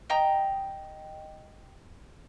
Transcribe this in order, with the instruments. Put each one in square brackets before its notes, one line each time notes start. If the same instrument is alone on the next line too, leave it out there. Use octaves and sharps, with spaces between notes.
[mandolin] D#5 G5 A#5